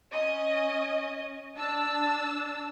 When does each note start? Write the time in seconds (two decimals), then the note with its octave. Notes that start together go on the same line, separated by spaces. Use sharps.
0.12 C#4 D#5
1.58 D4 A5 E6